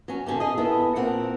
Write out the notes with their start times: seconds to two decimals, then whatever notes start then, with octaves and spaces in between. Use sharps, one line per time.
0.08 F#3 C#4
0.26 B2 D3 C#4 F#4 G4
0.40 G#4 D#5
0.58 B3 E4 A4 A#4
0.95 A#2 C4 A#4 F#5